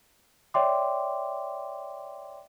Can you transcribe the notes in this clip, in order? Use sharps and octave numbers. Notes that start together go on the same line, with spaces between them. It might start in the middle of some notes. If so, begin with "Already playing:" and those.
C#5 D5 E5 G5 C6 D6